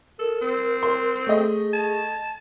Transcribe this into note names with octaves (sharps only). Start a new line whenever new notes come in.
A4 A#4
C4
C6
A3 G#4 D#5
A5